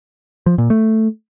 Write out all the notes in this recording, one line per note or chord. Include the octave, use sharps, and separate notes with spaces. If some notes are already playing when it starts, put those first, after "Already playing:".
F3
A#2
A3